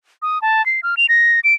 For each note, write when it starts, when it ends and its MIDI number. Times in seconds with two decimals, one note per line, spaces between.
0.22 0.41 87
0.42 0.65 81
0.66 0.80 96
0.83 0.95 89
0.97 1.06 101
1.09 1.40 94
1.44 1.54 98